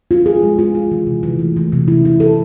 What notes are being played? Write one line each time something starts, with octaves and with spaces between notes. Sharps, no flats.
F4
G#4
G#3
F4
F4
E3
C3
E3
A3
E3
C3
E4
E4
A4